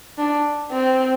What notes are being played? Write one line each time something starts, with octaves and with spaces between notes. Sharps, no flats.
D4
C4